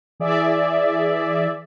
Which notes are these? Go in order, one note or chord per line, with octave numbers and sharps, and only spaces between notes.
E3 G#4 D5 E5